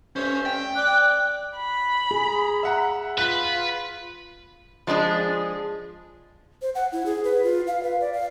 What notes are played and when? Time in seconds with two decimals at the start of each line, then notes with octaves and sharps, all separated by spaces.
0.16 G2 A3 C#4 C5
0.46 G5
0.76 D5 F#6
1.56 B5
2.11 G#4
2.63 E5 F#5 A#5
3.18 F4 B4 F#6 B6
4.87 F3 G#3 D4 G#4
6.62 C5
6.75 F#5
6.92 E4
7.06 G#4
7.24 B4
7.44 F4
7.67 F5
7.83 B4
8.01 D5
8.13 F5